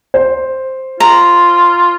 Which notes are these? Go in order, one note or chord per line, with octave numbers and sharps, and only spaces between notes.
C5
F4 A#5